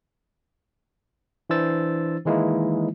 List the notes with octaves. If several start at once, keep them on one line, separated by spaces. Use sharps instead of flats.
E3 D4 E4 C5 E6 A6
D#3 E3 G#3 A#3 D#4 E4